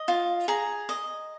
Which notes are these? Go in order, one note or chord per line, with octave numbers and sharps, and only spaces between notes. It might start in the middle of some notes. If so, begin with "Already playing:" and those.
Already playing: D#5
F4
G#4 A#5
D#5